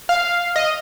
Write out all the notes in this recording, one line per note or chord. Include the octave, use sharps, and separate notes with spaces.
F5
D#5